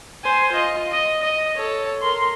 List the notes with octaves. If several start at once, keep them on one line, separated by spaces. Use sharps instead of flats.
C5 G#5
F4 D#5
D#5
D#5
A4 C#5
A#4 C6